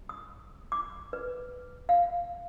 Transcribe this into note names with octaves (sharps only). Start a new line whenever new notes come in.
D#6
D6
B4
F5